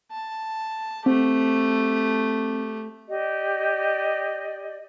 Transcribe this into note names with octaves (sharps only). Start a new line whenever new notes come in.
A5
A3 C4 G4
G4 D5 D#5